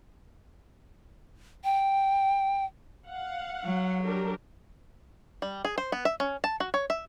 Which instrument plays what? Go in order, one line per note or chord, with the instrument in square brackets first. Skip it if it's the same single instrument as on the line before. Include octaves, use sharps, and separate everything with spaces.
[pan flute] G5
[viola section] F5 F#5
[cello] F#3
[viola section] D4 G4 A#4
[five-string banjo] G3
G#4
C5
B3
E5
C#4
A5
F#4
C#5
E5